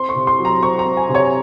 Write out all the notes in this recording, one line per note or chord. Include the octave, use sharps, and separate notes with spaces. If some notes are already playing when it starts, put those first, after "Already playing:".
Already playing: C4 C6
C#6
C3
C6
F#3
A#5
C4 C#6
A#5
C4
G#5
C3
C#5